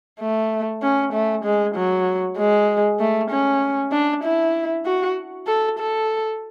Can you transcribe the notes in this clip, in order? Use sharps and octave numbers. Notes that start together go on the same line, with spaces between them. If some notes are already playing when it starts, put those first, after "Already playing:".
A3
C#4
A3
G#3
F#3
G#3
A3
C#4
D4
E4
F#4
A4
A4